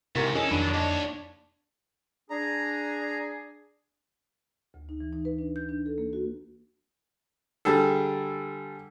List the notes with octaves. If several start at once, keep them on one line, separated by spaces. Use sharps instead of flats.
G#2 C3 E4 A#4 C#6 B6
F2 C#4 G#4 A4 D#5
F2 D#3 F#3 D4 B5
D#2 C#5 D#5
D4 G#4 A#5
D2
D#4
E3
D#4
B4
D4
G6
D4
A4
A#3
F#4
D3 G3 G#4 A4